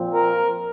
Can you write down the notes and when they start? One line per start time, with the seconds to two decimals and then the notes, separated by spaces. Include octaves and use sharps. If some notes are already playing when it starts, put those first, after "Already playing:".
Already playing: A#2 F3 C4
0.12 A#4